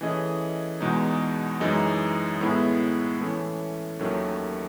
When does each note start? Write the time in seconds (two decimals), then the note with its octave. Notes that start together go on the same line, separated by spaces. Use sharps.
0.01 E3 A3 C#4 G#4 D#5
0.81 E2 B2 G#3 D#4
1.60 F#2 E3 G#3 D#4 G#4
2.41 A2 G#3 B3 E4 G#4
3.20 E3 A3 C#4
3.99 D#2 D#3 F#3 A3 C#4